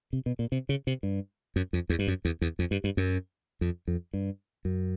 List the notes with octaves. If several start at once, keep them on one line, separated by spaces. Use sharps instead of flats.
C3
B2
A#2
C3
C#3
C3
G2
F#2
F2
E2
G2
F#2
E2
E2
F2
G2
G2
F#2
F2
F2
G2
F#2